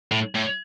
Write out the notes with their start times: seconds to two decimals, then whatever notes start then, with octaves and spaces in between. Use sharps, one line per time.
0.12 A2
0.35 A2